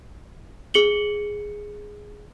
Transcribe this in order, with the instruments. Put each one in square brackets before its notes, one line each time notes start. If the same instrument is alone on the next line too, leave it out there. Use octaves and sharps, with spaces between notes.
[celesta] G#4 C#7 F#7 G7